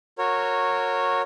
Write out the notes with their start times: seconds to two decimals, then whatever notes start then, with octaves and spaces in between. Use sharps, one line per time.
0.18 F#4 A#4 C#5